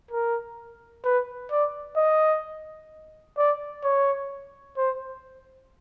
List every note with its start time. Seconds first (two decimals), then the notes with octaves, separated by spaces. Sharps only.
0.11 A#4
1.04 B4
1.51 D5
1.97 D#5
3.37 D5
3.84 C#5
4.77 C5